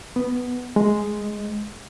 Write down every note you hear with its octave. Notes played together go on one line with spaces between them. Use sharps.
B3
G#3